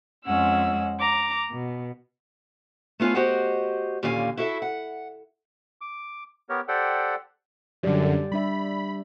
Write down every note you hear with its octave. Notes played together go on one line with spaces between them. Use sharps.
F2 G#3 C#4 F#5 E6
A#5 D6
B2
A3 B3 F4 C#5 G#5
F#4 G4 C5 D#5 F#5
D#2 A#2 D3 C#4 F5 G#5
E4 F#4 A4 E5
F#5
D6
B3 G4 A#4 C#5
G4 A4 C5 D5 F#5 G5
F#2 D3 G3 G4 D5
G3 D4 E5 B5